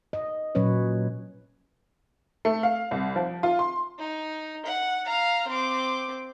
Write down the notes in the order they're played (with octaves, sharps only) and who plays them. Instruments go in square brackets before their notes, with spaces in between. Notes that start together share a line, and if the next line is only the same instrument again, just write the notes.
[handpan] D#5
A#2 F#3 C#4 B4 C#5
[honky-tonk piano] A3
F5
C2
F3
F4
C6
[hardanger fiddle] D#4
F#5
F5 A#5
C4 D6